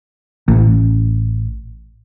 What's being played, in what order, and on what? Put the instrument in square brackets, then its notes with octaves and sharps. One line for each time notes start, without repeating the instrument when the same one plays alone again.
[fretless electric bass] A1